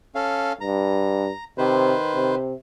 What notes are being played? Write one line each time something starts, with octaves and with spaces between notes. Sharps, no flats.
C#4 A4 F5
G2 A#5
C3 D#3 B4 C5
C3